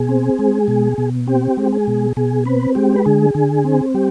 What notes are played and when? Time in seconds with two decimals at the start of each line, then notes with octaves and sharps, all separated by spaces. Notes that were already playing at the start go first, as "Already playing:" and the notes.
Already playing: B2 G#4
0.09 C4
0.39 G#3
0.68 B2
0.98 B2
1.27 C4 G4
1.57 G#3
1.73 G#4
1.87 B2
2.17 B2 G#4
2.45 C4 B4
2.75 G#3 G4
2.96 B4
3.06 D3 G#4
3.35 D3
3.64 C4
3.94 G3 G4